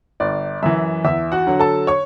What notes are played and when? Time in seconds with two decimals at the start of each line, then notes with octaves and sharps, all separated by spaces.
0.20 G1 D5
0.63 F#2 E3 E5
1.05 E2 E5
1.32 F#4 F#5
1.47 D3 F#3
1.59 A4 A5
1.87 C#5 C#6